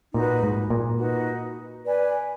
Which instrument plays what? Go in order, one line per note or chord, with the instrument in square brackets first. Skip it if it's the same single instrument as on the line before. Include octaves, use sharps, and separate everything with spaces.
[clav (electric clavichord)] A#2 [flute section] D#4 F#4 B4
[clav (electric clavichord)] G#2
A#2
[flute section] D#4 F#4 B4
B4 D5 G#5